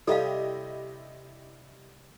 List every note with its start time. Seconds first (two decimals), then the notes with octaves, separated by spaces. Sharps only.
0.07 C3 G3 D4 E4 G4 A4 D#5 F5